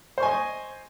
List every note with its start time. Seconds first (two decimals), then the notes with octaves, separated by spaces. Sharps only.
0.18 C5
0.20 C#6
0.23 G#5
0.25 D#5